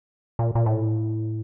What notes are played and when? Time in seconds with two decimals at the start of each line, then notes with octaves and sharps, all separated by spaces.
0.39 A#2
0.55 A#2
0.66 A2